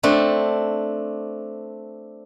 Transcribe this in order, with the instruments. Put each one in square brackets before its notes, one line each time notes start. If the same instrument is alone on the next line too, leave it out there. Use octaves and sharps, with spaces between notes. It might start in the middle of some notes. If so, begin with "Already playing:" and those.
[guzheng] A3 C4 D4